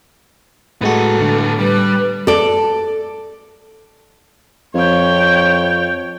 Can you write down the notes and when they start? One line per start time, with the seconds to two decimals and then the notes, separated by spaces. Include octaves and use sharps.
0.81 A2 G#3 B3 F#4 A4
1.20 A2 D3
1.59 G3 B4
2.27 A4 D5
4.75 F2 C#5 G5